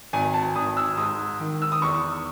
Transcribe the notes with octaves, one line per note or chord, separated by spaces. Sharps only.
G#1 G#5
A5
G#1 D#6
E6
G#2 D#6
D#3
E6
D#6
E2 C#6